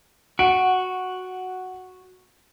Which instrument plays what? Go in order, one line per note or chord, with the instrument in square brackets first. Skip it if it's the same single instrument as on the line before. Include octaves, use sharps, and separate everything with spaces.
[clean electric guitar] F#4 [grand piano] F#5 D7